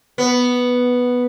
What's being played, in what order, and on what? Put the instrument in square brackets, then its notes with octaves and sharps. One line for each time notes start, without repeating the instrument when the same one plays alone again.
[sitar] B3